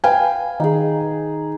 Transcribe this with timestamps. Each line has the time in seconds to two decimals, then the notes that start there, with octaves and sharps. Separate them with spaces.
0.04 B4 F5 G5 G#5
0.60 D#3 D#4 G#4